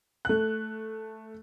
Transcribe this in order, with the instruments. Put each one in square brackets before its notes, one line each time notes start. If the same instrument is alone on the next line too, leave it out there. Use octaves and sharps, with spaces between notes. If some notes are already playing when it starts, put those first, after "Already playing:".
[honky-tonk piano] A3 F#6